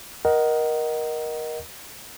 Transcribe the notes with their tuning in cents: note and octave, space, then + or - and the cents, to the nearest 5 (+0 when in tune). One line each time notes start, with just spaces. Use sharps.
A#4 +20 D#5 +0 F#5 +25